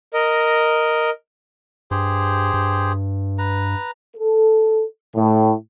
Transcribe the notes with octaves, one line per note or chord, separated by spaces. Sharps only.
A#4 D#5
G2 G4 G#4 C5
G2
B4 A#5
A4
A2